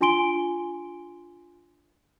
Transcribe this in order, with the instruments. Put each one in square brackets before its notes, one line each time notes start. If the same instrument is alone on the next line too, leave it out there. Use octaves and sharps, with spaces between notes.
[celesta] D4 F4 G#5 C6 D7 G7